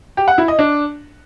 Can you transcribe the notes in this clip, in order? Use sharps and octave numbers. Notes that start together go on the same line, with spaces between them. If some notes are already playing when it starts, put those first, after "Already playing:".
G4
F#5
E4
D#5
D4